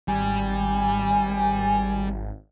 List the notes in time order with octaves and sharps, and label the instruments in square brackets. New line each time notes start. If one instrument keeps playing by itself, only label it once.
[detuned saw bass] G#1 [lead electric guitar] G3 [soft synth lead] G#5